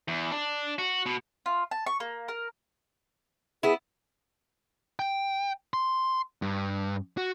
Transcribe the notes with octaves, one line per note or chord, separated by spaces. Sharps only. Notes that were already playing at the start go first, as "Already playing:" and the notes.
E2
D4
F#4
B2
F4
A5
C#6
A#3
A#4
B3 E4 G#4
G5
C6
G2
F#4